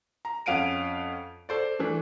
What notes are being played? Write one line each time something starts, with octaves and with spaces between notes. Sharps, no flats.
A#5
F2 C#4 F5 F#5 D7 D#7
A4 C5 D5
E3 A3 D4